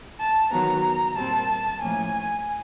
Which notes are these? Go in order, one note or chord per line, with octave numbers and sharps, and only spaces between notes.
A5
D#3 F#3 B3 A#5
A#2 G3 C4 A5
A2 F3 A#3 C#4 G#5